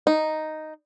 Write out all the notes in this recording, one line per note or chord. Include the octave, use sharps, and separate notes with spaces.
D#4